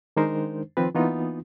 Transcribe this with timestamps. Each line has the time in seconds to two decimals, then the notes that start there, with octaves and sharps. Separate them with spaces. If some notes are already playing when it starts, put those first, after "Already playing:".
0.16 D#3 G#3 D4 D#4 A#4 C5
0.77 D#3 F3 C4 F4 B4
0.95 E3 A#3 B3 D#4 F4